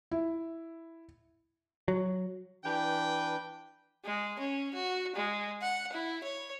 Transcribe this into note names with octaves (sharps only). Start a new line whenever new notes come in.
E4
F#3
E3 D4 B4 G5
G#3
C#4
F#4
G#3
F#5
E4
C#5